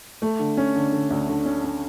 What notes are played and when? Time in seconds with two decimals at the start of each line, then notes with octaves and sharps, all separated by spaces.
0.22 A3
0.39 D3
0.57 C#4
0.75 D3
0.92 D3
1.10 D2
1.29 D3
1.45 C#4
1.64 C#4